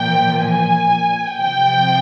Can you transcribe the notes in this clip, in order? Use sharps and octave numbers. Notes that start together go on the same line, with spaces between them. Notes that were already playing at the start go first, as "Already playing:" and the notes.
Already playing: A#2 F3 G5
G#5
C3 F3 G5